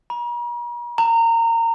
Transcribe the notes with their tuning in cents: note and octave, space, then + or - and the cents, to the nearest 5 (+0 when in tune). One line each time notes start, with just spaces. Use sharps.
A#5 +45
A#5 -25